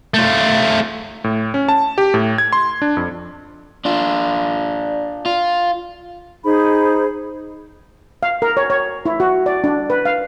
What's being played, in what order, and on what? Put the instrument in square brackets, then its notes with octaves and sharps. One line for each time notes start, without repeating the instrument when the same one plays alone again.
[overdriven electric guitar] A3 F4
[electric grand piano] A2
C#4
A5
G4
A2
G#6
C6
D4
F2
[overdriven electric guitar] D4 F4
F4
[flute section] D#4 G#4 C5 B5
[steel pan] F5
A#4
C#5
C#5
E4
F#4
D5
D4
B4
F5